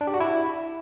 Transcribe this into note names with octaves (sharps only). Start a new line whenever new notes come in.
D4
G4
F#4
E4